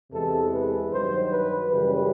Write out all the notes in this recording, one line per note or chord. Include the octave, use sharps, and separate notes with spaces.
E2 C3 E3 G#3 A4
B4
G2 D#3 F#3 C5
B4
F#2 C#3 E3 G3 B4